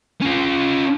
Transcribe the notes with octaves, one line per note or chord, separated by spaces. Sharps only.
C#4 F4